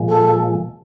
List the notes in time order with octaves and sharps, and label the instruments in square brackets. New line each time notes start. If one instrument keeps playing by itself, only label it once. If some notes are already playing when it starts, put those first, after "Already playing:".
Already playing: [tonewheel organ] A#2 F3 G#3
[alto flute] A4